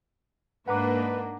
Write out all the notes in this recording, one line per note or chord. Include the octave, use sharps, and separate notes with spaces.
G#2 A#3 D4 B4 F#5 A#5 D6